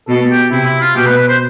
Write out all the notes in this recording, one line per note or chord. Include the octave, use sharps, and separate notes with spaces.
B2 A4
G4
C3 E4
E4
F4
B2 G4
B4
B4
C5